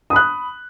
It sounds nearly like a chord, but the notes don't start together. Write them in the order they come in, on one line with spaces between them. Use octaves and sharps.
D#6 B5 F#6